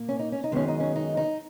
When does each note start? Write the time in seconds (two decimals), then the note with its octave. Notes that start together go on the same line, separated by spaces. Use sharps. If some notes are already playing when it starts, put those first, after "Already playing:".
Already playing: A#2 A#3
0.09 C#4
0.19 D#4
0.32 C#4
0.44 D#4
0.51 F#2 D#3 G#3 B3 C#4
0.68 D#4
0.80 C#4
0.96 D#4
1.17 D#4